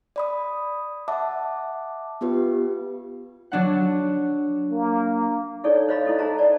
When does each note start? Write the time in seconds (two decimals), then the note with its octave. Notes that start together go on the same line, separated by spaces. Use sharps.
0.16 D5 B5 D#6
1.08 E5 F#5 A5 D6
2.21 B3 F4 G4 B4
3.52 F#3 D4 F#5
4.72 A#3
5.64 D#4 E4 G#4 A4 C#5 D5
5.89 C5 C#5 D#5 F5 B5
6.05 E4 A4 D#5
6.19 G#4 C5 A5 A#5
6.38 D5 A5